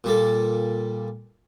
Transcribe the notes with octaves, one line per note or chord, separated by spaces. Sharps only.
A#2 G3 A4